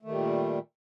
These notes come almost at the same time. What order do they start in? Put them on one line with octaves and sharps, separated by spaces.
A3 D#3 G3 A#2